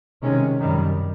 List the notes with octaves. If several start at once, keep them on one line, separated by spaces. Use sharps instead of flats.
C3 D#3 G#3 C#4
F#2 D#3 G3